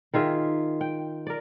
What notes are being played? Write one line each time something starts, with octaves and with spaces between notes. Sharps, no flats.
D#3 F4 G#4 E5
G5
A#4 D5